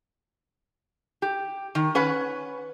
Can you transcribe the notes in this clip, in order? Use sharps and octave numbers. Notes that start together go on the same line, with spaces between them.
G4
D#3
C#4 B4 F#5